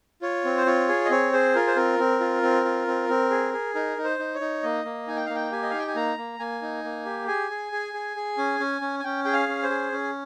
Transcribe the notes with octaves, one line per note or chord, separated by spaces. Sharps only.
F4 C#5
C4
C5
F4 C#5
G#4
D#5
C4 C#5
G#4 C5
F4 A#4
C5
C4 A#4
C4
F4
C4
F4
C4
C4
G#4
G#4
D#4 A#4
D#4
C5
D#4
C#5
D#4
A#3 D#5
A#3
D#4 G#5
G5
A#3 F5
G5
G4 G#5
D#5
D#4 F5
G5
G#5
A#3 A#5
A#3
A#3 G#5
D#4
A#3
G4
G#4 G#5
G#4
G#4
G#4
G#4
C#4
C#4
C#4
G#5
C#4 G5
G#4 G5
F5
C#4
C5
G#4
C#4